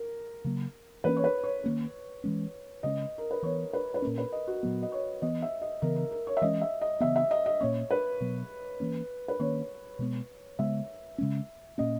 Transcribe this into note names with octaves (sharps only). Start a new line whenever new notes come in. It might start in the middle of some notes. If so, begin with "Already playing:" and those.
Already playing: A#4
C#3 F#3 A#3
E3 A#3 C#4 B4
C#5
B4
C#5
D#3 A#3 C#4
E3 G#3 C#4
C#3 G#3 C#4 D#5
A#4
B4
E3 B3 C#5
B4
B4
A#2 A#3 C#4 A#4
B4
D#5
F#4
A#2 F#3 B3
D#5
C#5
E3 B3 D#5
E5
D#5
C#3 E3 B3 A#4
A#4
A#4
C#5
E5
E3 G#3 C#4 D#5
E5
D#5
C#3 E3 B3 E5
E5
D#5
D#5
A#2 A#3 C#4 C#5
B4
B2 F#3 B3
E3 A#3 C#4
B4
D#3 A#3 C#4 C#5
B2 G#3 B3
C#3 G#3 B3 E5
C#3 G#3 C#4
A#2 A#3 C#4 D#5